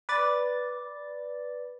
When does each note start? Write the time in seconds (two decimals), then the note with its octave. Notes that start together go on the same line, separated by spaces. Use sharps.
0.09 B4 D5 A6